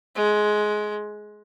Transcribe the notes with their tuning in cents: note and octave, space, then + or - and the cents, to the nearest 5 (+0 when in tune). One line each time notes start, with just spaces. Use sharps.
G#3 +15